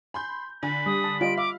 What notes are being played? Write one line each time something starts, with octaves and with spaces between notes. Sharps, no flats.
G#5 B5 C6 G6
D3 G#5 B5
G3 D#6
A5
G3 F4 D#5 D7
E5 F5 D6